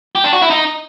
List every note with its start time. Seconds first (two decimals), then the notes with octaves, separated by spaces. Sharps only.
0.15 G4
0.24 D4
0.33 F#4
0.42 E4
0.50 D#4